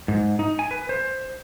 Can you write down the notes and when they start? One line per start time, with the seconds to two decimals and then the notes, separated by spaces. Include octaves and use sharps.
0.08 G#2
0.39 D#4
0.59 G#5
0.71 B4
0.89 C5